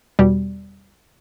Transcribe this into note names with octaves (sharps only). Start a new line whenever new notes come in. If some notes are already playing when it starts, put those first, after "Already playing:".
E2 B2 G3